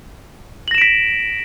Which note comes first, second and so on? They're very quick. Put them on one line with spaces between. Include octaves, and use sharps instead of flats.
F#7 A#6 E7 D7 B6